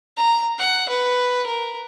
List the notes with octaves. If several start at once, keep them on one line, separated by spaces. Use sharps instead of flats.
A#5
F#5
B4
A#4